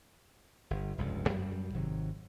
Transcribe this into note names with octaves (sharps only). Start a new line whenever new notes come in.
G1
F1 C#2 G2
F#2 F#3 G3
G#1 C3 D#3 F#3